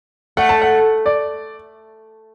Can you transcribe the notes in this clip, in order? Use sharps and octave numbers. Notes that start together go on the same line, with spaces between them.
A3 F#5
A5
F#5
D5